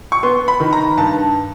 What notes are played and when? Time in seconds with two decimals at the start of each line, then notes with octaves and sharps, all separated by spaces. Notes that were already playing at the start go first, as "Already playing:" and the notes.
0.12 C#6
0.23 B3 C6
0.48 B5
0.60 D#3
0.73 A#5
0.97 G2 A5